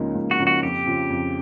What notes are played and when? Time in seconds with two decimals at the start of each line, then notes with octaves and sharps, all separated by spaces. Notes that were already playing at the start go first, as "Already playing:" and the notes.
Already playing: C#2 C#3 F3 A#3 D#4
0.15 C#2
0.31 F#4
0.39 C#3 F3 A#3 D#4
0.47 F#4
0.63 F2 G4
0.86 C#3 F3
1.10 F2